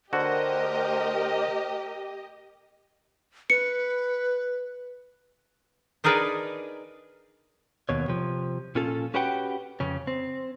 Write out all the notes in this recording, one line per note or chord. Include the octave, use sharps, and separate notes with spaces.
D3 A3 F#4 G4 A#4 C5 D#5 G5
B4 C#7
D4 D#4 G#4 A#4 B4 D5
D#2 B2 C#5
C3 F3
A#2 C#4 F4 A4
C#4 F#4 G4 B4 F#5 G5
F2 C#3 C#4
C4